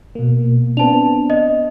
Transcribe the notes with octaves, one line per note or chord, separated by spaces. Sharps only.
B2 A#3
B3 C4 D4 A5 F7
D#5